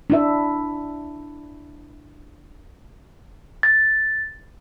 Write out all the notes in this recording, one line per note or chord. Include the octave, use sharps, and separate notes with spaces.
D4 E4 E5
A6